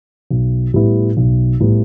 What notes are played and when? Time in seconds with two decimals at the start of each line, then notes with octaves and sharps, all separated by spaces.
0.31 B1
0.74 A2 G3 B3 E4
1.17 B1
1.60 A2 G3 B3 E4